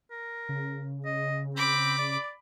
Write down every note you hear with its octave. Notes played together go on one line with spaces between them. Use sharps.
A#4
C#3
D#5
C4 B5 D6
D5